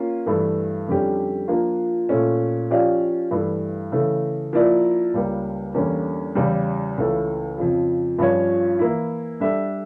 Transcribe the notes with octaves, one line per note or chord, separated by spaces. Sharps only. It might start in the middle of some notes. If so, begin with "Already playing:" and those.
Already playing: A#3 C#4 F4
G2 E3 A3
F2 D3 G3 C#4 G4
F3 A#3 D4 F4
A#2 A3 C#4
F3 C#4 G4 D5 F5
G2 E3 A3
C#3 E3 A3
F3 A#3 E4 A#4 D5
C#2 C#3 G3 A#3
E2 D3 G3 A#3 C#4
E2 C#3 G3
C#2 C#3 E3 A3
F2 C#3 F3
G2 F3 C#4 F4 C#5
E3 A#3 E4
G3 D4 A4 E5